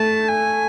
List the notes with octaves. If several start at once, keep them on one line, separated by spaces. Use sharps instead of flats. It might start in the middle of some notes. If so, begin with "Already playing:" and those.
Already playing: A3 A5
G#5